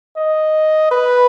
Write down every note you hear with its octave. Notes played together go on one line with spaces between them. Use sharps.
D#5
B4